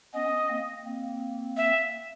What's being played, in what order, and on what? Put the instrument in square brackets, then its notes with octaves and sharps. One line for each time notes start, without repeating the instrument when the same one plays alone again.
[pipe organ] B3 C#4 [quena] D#5
[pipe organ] A#3 C4
A#3 C4
[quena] E5